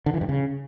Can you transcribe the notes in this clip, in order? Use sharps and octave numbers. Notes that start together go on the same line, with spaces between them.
D3
E3
G2
C#3